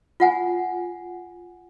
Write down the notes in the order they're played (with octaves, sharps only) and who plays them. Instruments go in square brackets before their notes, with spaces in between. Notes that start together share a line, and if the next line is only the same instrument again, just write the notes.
[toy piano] F4 F#5 G#5